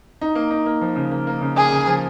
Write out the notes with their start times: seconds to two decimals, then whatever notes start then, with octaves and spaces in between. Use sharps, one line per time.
0.21 D#4
0.35 A#3
0.51 D#4
0.66 A#3
0.81 F3
0.96 C#3
1.11 A#3
1.27 A#3
1.41 C#3
1.56 A#3 G#4
1.72 C#3
1.87 F3